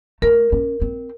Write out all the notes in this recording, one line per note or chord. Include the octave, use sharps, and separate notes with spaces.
A3 A#4
C#4
C4